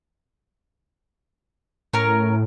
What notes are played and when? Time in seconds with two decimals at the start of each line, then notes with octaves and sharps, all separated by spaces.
1.93 A2 C#4 A#4 F6
2.07 A2